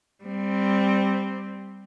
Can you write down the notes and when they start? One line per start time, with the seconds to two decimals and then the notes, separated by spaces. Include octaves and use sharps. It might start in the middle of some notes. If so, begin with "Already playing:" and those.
0.24 G3 C4